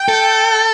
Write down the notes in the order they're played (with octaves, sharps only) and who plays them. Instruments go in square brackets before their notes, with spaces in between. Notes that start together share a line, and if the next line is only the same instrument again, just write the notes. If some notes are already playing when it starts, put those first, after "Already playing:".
Already playing: [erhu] G5
[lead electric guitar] A4